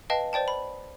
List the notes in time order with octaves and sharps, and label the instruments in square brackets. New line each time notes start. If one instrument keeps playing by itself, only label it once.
[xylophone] B4 D#5 F5 G5 A5
C5 D5 G5 A5
B5